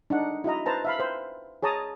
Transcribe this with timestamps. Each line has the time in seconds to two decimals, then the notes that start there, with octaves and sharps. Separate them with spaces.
0.10 D4 D#4 F#5
0.44 E4 F#4 D#5 A#5
0.66 B4 C5 A5 A#5
0.85 E5 F5 B5
0.99 B4 C5
1.63 G#4 C#5 A5 A#5 D#6